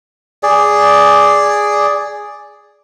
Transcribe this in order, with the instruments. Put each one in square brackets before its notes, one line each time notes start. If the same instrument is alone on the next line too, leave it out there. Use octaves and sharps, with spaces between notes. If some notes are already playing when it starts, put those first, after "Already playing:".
[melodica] G#4 D5